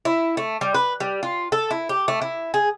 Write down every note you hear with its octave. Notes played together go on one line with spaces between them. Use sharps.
E4
A3
G3
B4
G3
F4
A4
E4
G4
A3
E4
G#4